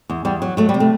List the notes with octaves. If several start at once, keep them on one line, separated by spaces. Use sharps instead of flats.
E2
E2 G3
F#3
F#3 A3
G3
C3
A3